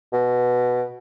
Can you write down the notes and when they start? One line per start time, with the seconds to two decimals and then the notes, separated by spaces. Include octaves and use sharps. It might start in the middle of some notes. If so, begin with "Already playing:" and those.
0.13 B2